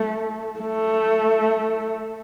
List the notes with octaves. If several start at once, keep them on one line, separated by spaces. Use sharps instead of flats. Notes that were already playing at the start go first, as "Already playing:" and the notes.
Already playing: A3
A3